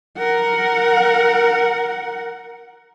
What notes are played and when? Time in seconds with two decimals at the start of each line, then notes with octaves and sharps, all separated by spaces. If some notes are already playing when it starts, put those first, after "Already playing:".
0.18 A#4 F#5